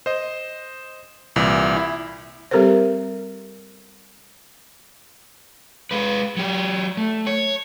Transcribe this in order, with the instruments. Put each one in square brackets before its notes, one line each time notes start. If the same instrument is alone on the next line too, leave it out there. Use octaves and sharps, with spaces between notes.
[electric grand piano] C5 D#5
C2 A#2 E3
E4
[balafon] G3 C4 G4 A4 A#4 C5
[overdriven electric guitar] G#3 B4
F#3 G4
A3
C#5